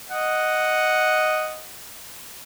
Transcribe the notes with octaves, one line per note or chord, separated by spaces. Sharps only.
D#5 F#5